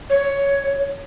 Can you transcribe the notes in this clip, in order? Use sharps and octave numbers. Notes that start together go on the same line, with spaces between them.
C#5